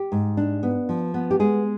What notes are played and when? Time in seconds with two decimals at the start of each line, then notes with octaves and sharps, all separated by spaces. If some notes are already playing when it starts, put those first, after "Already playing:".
Already playing: G4
0.12 G#2
0.37 D4
0.63 B3
0.89 F3
1.14 B3
1.31 G4
1.40 G#3 G#4